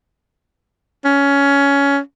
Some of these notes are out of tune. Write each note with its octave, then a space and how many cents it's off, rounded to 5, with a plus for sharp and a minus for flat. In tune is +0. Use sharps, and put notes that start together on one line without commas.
C#4 +15